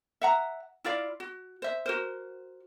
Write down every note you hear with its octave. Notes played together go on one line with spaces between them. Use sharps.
E5 F#5 A#5
E4 F4 D5 F5
F#4
C5 E5
F#4 A#4 C5